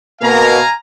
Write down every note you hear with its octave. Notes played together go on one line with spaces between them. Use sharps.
B2 A#3 F5 G#5 A#5